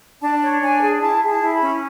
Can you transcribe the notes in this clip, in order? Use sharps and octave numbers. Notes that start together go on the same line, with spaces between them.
D4 A5
C#5
D4 G#5
G#4
E4 A5
G#4
A5
E4
B5
C#4